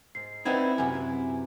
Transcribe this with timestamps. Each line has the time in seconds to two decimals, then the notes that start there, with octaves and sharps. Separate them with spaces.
0.15 G#2 C7
0.45 C4 D#4 E4 B4 D5 F#5 G#6
0.78 F#2 C3 B4 C#5 F#5 G#5
0.94 E4